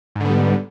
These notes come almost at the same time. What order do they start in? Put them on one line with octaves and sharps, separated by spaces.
G#2 D3 B3 G3